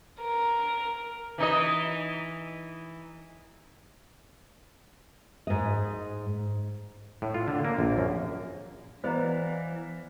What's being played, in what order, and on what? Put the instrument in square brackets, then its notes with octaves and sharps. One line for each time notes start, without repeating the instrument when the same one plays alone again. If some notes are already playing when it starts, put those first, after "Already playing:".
[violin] A#4
[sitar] E3 D#4 D#5
[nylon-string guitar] G#2 D#5
[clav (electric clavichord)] A2
F4
D3
A#3
A#1
F#2
[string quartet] E3 [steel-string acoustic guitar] B3 D5 F5 [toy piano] C5 D#5 A#5